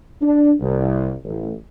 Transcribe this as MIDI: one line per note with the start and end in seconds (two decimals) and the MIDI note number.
0.22 0.53 62
0.60 1.13 36
1.25 1.53 33